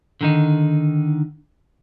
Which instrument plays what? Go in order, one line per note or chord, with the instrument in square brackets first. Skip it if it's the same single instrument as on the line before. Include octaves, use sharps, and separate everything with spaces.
[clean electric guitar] D3 D#3 D#4